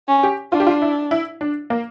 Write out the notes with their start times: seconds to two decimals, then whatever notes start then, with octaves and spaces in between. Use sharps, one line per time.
0.08 C#4
0.23 G4
0.52 D4 F4
0.60 G4
0.67 F4
0.82 E4
1.11 E4
1.41 D4
1.70 A#3